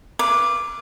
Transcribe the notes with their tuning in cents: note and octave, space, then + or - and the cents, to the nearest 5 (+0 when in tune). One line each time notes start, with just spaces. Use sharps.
B4 -25 F5 -35 D6 +0